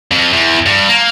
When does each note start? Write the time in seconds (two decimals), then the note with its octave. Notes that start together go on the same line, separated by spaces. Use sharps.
0.11 F2
0.33 E2
0.66 G2
0.89 A#3